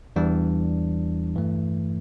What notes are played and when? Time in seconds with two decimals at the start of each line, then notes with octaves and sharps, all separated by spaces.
0.16 E2 E3 G3 D4
1.36 G2 E3 A3